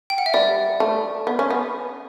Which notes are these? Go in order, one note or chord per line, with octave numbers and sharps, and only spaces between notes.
G5
F#5
E5
G3 D5
A3
B3
C#4
B3